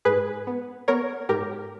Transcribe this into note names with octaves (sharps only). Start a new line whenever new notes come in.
G#2 G#4 B4
B3
B3 A#4 C#5
G#2 G4 A#4